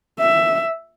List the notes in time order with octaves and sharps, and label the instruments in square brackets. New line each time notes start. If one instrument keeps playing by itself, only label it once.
[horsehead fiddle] E5